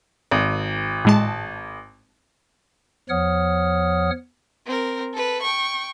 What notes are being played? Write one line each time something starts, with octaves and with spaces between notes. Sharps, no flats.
G#1
A2 G#3 A5
E2 F3 C#5 F#5 D#6 F6
C4 A#4
A4 B4
G5 C#6